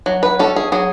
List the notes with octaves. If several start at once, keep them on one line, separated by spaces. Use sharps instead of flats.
F#3
B4
C#4 A4
G#4
F#3 G#4